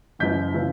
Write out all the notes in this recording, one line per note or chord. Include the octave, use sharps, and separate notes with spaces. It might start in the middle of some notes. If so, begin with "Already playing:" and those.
F#1 F#2 E3 G6 B6
C#3 E3